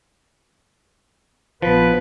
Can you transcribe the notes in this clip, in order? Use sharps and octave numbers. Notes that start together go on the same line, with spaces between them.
A#1 F3 B3 B4